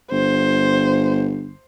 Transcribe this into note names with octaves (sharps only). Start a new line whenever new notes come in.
G1 C5